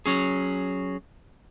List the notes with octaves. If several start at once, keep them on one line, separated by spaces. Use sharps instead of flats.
F#3 C#4 G#4